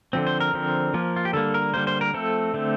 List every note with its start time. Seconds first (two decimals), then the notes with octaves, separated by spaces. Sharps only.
0.13 D3 F3 C4
0.27 C5
0.40 A#4
0.53 D3 F3 C4
0.94 F3 A#3
1.16 F4
1.25 G4
1.33 D3 G3 A#3 A4
1.54 A#4
1.74 D3 G3 A#3 C5
1.87 C5
2.01 A#4
2.13 F3 A3 C4 A4
2.54 D3 A3 C4